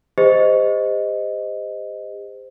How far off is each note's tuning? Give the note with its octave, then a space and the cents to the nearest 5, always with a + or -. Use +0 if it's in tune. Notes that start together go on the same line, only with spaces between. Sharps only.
G4 +45 C5 -15 D#5 +0